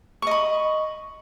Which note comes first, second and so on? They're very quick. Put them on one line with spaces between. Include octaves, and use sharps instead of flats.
C#6 D#5 B5